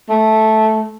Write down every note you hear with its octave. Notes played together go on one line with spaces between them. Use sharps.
A3